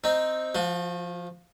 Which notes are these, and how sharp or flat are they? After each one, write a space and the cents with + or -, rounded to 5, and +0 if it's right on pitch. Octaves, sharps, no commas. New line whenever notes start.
C4 +0 D#4 +0
F3 +0 F#4 -40